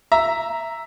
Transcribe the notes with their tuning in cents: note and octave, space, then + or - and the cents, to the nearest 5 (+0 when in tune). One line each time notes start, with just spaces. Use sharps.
E5 +0 A#5 +0